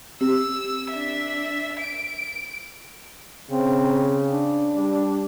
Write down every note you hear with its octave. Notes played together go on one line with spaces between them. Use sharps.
C4 G4 E6
D4 E5
D7
C#3 C4
D4
G3